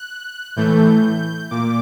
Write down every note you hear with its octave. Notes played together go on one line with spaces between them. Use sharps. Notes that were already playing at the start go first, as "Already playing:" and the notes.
Already playing: F#6
A2 E3 A3 G6
A#2 D6